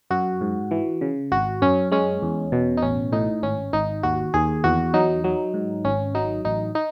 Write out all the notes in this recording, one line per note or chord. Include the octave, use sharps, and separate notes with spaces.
F#2 F#4
G#2
E3
C#3
G#1 F#4
F#2 C#4
G#3 C#4
E2
B2
D#4
A1 C#4
A2 D#4
G#1 C#4
G#1 D#4
D#2 F#4
D#2 G#4
E2 F#4
F#3 D#4
F#3
G#2
G#1 C#4
F#3 D#4
A1 D#4
D#4